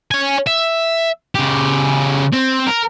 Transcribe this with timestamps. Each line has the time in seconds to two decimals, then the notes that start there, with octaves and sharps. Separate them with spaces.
0.11 C#5 G#5
0.47 E5
1.35 C#3 G4
2.34 C4
2.68 A#4